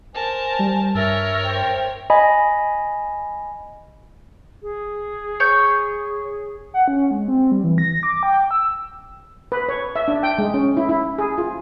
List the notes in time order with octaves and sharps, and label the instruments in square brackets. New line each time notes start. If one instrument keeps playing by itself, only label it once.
[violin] A#4 A5 [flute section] C5 G#5
[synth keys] G3
[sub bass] G2 [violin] A#4 C#5 [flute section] E5 E6 F6 [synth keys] A6
[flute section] C5 E5 G5
[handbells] D#5 G#5 B5
[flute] G#4
[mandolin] C#5 C#6 G6
[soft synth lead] F#5
C#4
G#3
C4
G3
E3
A#6
D6
G5
E6
[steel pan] B4
C#5
E5
D4
G5
G#3
C#4
E4
E4
G#4
F4